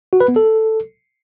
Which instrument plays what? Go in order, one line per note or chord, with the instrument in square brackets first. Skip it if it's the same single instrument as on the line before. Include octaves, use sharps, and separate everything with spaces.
[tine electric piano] F#4
B4
B3
A4